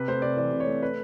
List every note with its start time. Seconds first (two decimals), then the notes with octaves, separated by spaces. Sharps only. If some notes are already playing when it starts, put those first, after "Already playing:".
Already playing: C3 B4
0.08 A3 C5
0.22 C3 D5
0.37 E3 D5
0.52 C3
0.60 C#5
0.66 A3
0.82 B4